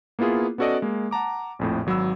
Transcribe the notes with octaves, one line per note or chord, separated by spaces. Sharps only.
A#3 B3 E4 F4 G#4
B3 C#4 F#4 A4 D5 D#5
G#3 A#3
F#5 A5 A#5 D6
A#1 F2 A2
G#1 F#3 B5 E6